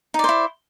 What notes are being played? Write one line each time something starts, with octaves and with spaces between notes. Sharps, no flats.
D#4 E4 C5 D5